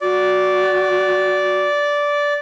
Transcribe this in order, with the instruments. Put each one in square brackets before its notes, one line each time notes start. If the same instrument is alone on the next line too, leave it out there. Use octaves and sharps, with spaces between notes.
[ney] F#4 [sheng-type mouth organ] D5